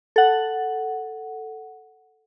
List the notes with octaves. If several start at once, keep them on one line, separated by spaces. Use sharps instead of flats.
A4 F#5